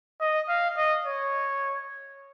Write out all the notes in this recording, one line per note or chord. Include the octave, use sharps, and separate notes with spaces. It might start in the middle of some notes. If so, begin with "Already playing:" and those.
D#5
F5
D#5
C#5